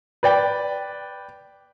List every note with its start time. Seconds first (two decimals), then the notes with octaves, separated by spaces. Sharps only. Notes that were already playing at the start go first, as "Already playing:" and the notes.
0.23 B4 D5 G5